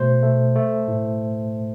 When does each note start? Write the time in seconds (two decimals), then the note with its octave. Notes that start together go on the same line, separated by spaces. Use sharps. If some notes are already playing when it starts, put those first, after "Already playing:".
Already playing: B2 A3 C5
0.23 A3
0.56 A3
0.88 A2